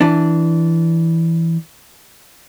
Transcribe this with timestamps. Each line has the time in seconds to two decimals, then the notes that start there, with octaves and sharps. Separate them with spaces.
0.01 E3 D4